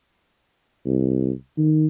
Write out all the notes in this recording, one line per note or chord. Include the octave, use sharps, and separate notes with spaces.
C2
D#3